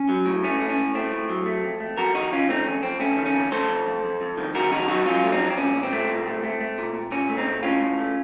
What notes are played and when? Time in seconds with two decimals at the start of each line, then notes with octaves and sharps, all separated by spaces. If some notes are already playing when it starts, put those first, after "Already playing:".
Already playing: C#4
0.09 F#3
0.26 A2
0.44 A3 C#4
0.61 A2
0.69 C#4
0.77 A2
0.95 A3 C4
1.12 A2
1.29 F#3
1.46 A3
1.64 F2
1.80 A3
1.98 F2 F#4 A#4
2.15 D#3 D#4 F#4
2.32 D#3 C#4 F4
2.49 A3 C4 D#4
2.66 F2 C#4
2.83 F2 C4
3.00 A3 C#4
3.17 D#3
3.26 C#4
3.34 F2
3.52 A3 A4 C5
3.69 F2
3.86 F2
4.04 F2
4.21 F2
4.37 D#3
4.55 D#3 F#4 A#4
4.72 F2 D#4 F#4
4.88 F#3 D#4 F#4
5.06 F#3 C#4 F4
5.24 A3
5.32 C4 D#4
5.40 F2
5.50 C4
5.57 A#2 C#4
5.75 A#2
5.83 C4
5.92 A3
6.09 A#2
6.27 A3
6.43 A3
6.61 A3
6.78 A#2
6.94 A#2
7.11 A#2 C#4
7.29 A3
7.37 C4 D#4
7.46 A#2
7.63 A2 C#4 F4
7.81 A2
7.98 A3